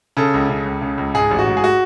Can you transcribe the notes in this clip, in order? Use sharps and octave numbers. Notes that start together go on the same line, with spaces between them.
C#3 A4
C#2
C#3
C#2
C#3
C#2
G#2 G#4
A1
F#4
G#2
G#4
F#4